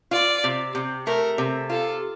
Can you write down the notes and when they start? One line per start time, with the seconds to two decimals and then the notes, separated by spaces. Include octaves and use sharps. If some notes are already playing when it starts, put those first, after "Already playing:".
0.11 F4 D5
0.44 C3
0.75 C3
1.07 A3 A#4
1.38 C3
1.70 F4 A4